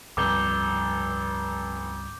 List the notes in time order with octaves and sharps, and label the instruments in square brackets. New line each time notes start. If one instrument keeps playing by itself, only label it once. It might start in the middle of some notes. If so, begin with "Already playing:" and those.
[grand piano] F1 [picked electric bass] C#2 G2 [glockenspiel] D6 G6 G7